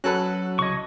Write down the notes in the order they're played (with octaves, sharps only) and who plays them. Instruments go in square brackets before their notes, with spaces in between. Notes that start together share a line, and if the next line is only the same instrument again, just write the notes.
[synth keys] F#3 F#6 [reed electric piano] C#4 [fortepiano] F#4 A4 B4
[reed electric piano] C2 C#3 G#6 [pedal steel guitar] D#5 C#6